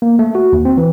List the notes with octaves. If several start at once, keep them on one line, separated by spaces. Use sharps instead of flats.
A#3
A3
F#4
D#2
C4
E3